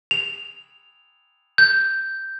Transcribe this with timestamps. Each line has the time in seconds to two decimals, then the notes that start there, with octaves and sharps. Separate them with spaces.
0.11 F7
1.58 G6